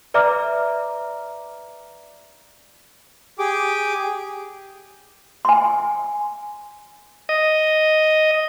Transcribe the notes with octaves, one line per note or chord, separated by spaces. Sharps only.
B4 D5 E5 A#5 D6 F6
G4 G#4 D6
G#5 C6
D#5